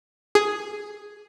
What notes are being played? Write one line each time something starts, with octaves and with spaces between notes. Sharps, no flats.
G#4